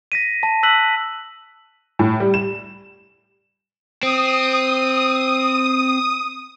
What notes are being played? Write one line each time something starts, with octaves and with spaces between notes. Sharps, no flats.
A#6 B6 D#7
A5
E6 F#6 B6 F#7
A2
G3
E7
C4 D#6